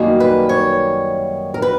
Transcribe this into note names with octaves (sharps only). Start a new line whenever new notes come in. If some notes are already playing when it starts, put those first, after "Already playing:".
Already playing: F#2 D#3 G3 A#3
B4
C#5
A#4
B4